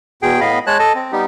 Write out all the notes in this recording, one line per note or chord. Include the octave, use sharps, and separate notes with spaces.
E2 B2 G#4 G5
A2 B3 D#5 F5 B5
G#3 C#5 A5 F#6
A4 D#5 A5
C4
G3 B3 D#4 G4